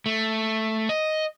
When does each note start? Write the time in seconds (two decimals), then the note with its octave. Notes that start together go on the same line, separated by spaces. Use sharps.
0.06 A3
0.89 D#5